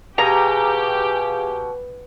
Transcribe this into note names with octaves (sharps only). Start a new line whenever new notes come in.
B2 G4 G#4 F5 G#5 A#5